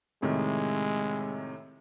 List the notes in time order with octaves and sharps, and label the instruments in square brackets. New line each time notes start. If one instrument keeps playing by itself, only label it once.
[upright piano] A2 C3 D#3 [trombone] G#3